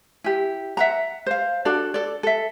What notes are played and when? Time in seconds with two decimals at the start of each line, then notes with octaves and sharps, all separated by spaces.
0.24 E4 G4
0.77 E5 F#5 A#5
1.26 C5 F5
1.65 D4 F#4 A4 D5
1.94 A4 D5
2.23 A4 E5